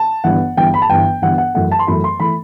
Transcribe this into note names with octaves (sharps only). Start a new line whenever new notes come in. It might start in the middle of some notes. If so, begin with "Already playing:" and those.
Already playing: A5
G1 G2 E3 F#5
G1 G2 E3 G5
B5
A5
G1 G2 E3 G5
G1 G2 E3 F#5
F#5
F#2 E3 A3 F#5
A5
C6
F#2 E3 A3 B5
C6
E3 A3 B5